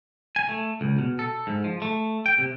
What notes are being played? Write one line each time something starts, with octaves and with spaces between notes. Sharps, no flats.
G#5
A3
C#2
B2
A4
G#2
F3
A3
G5
C3